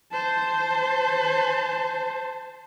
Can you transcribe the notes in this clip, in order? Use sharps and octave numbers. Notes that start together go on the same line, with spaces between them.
C5 A5